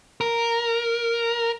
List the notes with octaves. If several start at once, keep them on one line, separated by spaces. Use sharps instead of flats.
A#4